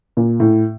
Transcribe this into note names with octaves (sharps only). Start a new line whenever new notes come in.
A#2
A2